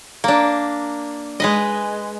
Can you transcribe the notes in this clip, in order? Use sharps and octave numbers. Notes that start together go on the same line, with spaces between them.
A#3 D4
G#3 B4 D#5